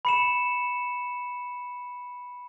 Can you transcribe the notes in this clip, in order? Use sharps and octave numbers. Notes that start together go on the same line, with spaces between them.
B5 C#7 E7